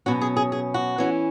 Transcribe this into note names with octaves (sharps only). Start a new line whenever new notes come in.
B2 F#3 C#4 F#4
G#4
G#4
G#4
F#4
E3 C#4 E4